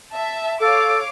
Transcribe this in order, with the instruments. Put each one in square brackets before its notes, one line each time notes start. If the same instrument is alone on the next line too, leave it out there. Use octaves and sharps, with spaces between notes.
[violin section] E5 A5
[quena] A4 [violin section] C#5 F5 D6